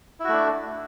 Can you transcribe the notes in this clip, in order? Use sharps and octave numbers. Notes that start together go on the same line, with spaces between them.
A3 D4 E4 F#4